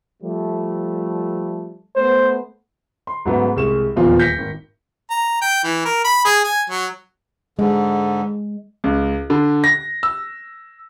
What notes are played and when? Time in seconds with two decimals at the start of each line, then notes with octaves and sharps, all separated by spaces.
0.21 F3 G3 A3
1.96 A3 B3 C5
3.07 C6
3.25 G#2 C#3 F#3 A3 B3
3.56 C2 G#3 C#6 E7
3.96 D#1 E2 F3 F4
4.19 G6 A#6 B6 C#7
4.38 G#1
5.10 A#5
5.42 G5
5.64 E3
5.85 A#4
6.05 B5
6.25 G#4
6.44 G#5
6.70 F#3
7.59 G#2 D3 G#3
8.84 C#2
9.30 D3
9.64 A#6
10.03 E6